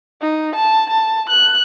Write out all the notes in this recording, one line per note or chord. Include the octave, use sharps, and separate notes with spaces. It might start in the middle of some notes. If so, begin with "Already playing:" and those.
D#4
A5
A5
F#6